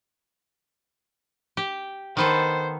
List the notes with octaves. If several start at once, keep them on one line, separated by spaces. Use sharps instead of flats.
G4
D#3 B3 A4 C5